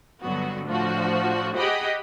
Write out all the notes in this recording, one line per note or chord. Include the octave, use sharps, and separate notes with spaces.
G2 D3 F#3 B3 F#4
A2 F3 D4 F#4
G4 G#4 D#5 F#5 B5